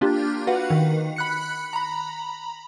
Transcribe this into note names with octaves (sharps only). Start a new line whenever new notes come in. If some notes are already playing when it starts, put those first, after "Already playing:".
A#3 D4 F4 G4
F#4 B4 F5 F#5
D#3
B5 F#6 C#7
A#5 B5